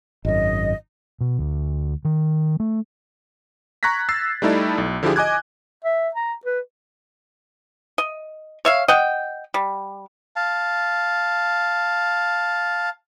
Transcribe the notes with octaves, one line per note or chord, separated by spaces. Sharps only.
G#1 F#2 D#5
B2
D2
D#3
A3
A#5 C#6 F#6 G#6 A#6 B6
E6 A6 C7
G3 A3 D#4 E4 A4 D5
B1
D3 F3 E4 F4 G4 G#4
D#5 G#5 D6 F#6 G#6
E5
A#5
B4
D#5
C#5 E5 F5
D#5 F#5 G5
G3
F5 A5